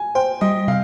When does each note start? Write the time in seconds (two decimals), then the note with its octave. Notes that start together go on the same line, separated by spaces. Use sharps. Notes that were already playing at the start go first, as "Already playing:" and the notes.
Already playing: G#5
0.15 C5 G5
0.41 G3 D#5
0.68 C3 F5